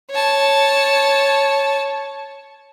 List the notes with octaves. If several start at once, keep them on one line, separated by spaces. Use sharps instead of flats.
C#5 A5